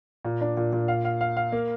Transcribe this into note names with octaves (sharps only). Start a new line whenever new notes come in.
A#2
D4
A#2
A#2
F5
F5
F5
F5
A#3